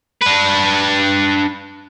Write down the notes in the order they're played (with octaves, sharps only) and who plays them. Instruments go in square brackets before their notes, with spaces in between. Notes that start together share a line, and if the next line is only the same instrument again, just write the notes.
[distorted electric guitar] D4 B4